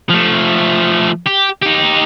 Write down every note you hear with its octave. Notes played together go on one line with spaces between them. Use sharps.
F3 A3
G4
D#4 G4